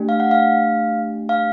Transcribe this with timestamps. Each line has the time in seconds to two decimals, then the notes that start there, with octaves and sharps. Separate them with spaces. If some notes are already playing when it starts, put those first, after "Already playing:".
Already playing: A3 D4 G4
0.09 F5
0.20 F#5
0.31 F5
1.29 F5